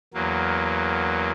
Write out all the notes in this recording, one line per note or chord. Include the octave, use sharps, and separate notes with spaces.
E2 F#3 A#3